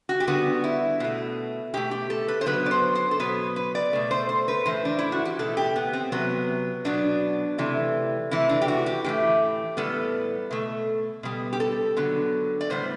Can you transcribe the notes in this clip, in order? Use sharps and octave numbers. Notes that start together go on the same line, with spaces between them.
F#4
G4
D3 G3 B3 F#4
E4
B2 A3
B2 A3 G4
G4
A4
B4
C5
D3 F#3 B3 B4
D5
C5
C5
A4
B2 F#3 B3 B4
B4
D5
B2 A3
C5
C5
B4
A2 E3 A3 C5
D4
E4
F#4
G4
B2 A3 A4
G4
B3
C4
C3 F#3 B3
B2 F#3 B3 D4
C3 E3 A3
C3 E3 A3 E4
D4
G4
F#4
G4
A2 E3 A3 G4
A2 G3 B3 A4
B2 A3
B2 G3 B3
G4
A4
D3 F#3 B3
D5
A2 G3 B3 C5